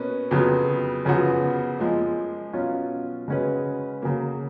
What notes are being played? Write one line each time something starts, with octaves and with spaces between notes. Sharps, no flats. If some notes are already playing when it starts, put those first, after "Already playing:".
Already playing: B2 A#3 C#4 B4
F2 C#3 F#3 B3
F#2 C#3 F3 B3 F#4
F#2 F3 G#3
B2 F#3 C#4 F4
C#3 G#3 C#4 F#4 B4
C#3 F#3 A#3